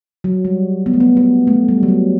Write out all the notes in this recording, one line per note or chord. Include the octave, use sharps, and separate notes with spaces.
F#3
G3
B3
A3
B3
B3
A3
G3
F#3
G3